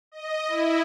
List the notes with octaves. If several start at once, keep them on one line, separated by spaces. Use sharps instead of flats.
D#5
E4